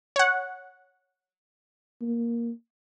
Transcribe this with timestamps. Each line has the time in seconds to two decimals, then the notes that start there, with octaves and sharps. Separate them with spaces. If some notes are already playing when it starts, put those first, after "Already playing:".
0.16 C#5 F#5
2.01 A#3